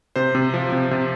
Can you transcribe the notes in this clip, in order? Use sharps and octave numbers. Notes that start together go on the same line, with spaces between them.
C3 C5
C3
F3
C3
C3